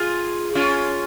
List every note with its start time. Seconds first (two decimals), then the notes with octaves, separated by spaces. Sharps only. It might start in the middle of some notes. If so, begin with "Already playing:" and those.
Already playing: F4 G#4
0.55 C#4 F4